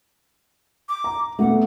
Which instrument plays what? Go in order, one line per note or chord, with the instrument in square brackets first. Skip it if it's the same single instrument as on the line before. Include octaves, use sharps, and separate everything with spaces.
[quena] D6
[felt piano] A#5
[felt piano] A3 B3 [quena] F#5